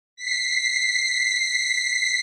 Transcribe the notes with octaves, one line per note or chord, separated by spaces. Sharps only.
B6 C7